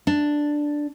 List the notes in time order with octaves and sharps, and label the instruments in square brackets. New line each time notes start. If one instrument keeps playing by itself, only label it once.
[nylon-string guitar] D4